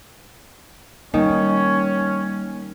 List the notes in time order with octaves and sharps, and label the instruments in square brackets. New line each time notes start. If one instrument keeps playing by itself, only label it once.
[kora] D#3 [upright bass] G3 [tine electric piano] A#3 [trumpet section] C#4